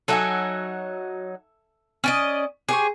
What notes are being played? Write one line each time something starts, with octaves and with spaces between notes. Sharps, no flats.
F#3 D#4 A4 E5 G#5
C#4 D5 D#5
G4 G#4 C5 C#6